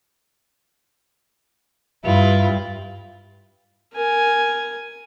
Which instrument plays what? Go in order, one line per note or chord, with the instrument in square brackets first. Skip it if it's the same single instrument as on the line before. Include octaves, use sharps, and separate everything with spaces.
[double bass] G2 [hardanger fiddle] E4 F4
[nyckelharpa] A#4 G#5